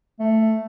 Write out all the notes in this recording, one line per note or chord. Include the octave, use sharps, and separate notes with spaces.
A3